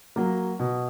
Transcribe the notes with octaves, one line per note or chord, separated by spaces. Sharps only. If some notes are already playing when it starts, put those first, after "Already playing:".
F#3 A#3
B2